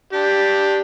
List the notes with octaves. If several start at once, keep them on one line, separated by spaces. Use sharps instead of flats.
D4 G4